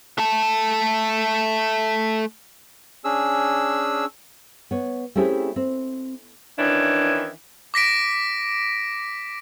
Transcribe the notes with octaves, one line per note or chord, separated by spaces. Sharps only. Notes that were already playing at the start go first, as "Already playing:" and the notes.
A3 A4
C#4 D4 G#4 E6
B3 C#5
A3 C4 C#4 E4 G4 G#4
C4
D#3 E3 C#4 D4 E4
D6 A#6 B6 D7